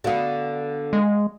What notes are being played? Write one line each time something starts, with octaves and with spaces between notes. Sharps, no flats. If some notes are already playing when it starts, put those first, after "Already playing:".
D3 B3 F#4 F5
G#3